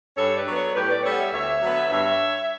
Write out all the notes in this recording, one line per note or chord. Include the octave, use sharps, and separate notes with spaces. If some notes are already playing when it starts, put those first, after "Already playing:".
G2 A4 C#5
B4 D5
F#3 B3
A4 C#5
A2 G4 B4
B4 D5
G3 B3 A4 C#5
C#5 E5
D2 C#5 E5
D3 F#3 B3
G2 C#5 E5